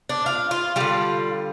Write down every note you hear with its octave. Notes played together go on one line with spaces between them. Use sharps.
D4
F4
F4
D3 G3 F4